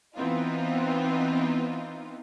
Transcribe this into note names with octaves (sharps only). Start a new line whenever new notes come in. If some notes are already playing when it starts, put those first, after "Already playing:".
E3 B3 C4 D#4 F4